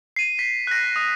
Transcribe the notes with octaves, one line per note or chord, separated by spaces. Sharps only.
C7 D#7
B6
F#6 A#6
D#6